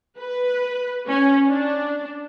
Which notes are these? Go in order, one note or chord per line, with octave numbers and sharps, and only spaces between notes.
B4
C#4
D4